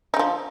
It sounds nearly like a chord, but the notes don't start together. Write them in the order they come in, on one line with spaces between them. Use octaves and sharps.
D#4 D3 F3